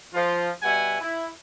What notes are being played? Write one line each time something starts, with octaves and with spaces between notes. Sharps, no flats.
F3 F4
B2 G3 E5 F#5 G#5
E4